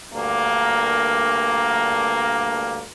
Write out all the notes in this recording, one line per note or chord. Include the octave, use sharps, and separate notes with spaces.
D2 G2 A#3